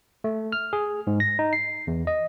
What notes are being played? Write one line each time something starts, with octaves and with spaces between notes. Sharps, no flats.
A3
F6
G#4
G#2
A#6
D#4
C7
E2
D#5